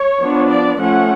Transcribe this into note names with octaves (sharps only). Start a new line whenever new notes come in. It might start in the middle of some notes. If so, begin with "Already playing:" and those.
Already playing: C#5
F3 B3 D4
D5
F3 A3 C#4 F#5